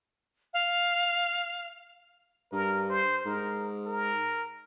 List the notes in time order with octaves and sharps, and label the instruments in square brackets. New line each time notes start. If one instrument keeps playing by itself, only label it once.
[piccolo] F5
[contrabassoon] G2 [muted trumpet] A#4
[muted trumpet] C5
[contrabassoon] G#2 [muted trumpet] A#4
[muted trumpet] A#4